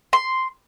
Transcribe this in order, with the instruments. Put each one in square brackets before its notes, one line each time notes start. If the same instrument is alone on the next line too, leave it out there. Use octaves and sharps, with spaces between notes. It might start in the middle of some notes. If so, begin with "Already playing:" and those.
[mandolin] C6